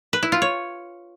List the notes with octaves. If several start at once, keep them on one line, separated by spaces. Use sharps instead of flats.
B4
E4
F4
C#5